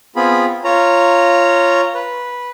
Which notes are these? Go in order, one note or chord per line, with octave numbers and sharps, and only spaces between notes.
B3 C4 F4 G#4 B5
F4 C#5 A#5
B4